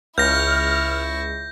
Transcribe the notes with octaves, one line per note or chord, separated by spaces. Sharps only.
C#2 E4 C#6 F6 G6 A#6